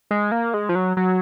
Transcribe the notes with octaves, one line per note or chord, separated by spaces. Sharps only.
G#3
A#3
G#3
F3
F#3
F#3